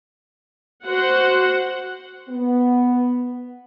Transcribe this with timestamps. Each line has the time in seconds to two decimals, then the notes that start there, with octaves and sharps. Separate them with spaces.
0.83 F#4 C5 F#5
2.30 B3